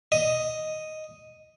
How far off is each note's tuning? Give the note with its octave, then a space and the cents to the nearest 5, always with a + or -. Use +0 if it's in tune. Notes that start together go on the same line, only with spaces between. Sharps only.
D#5 +0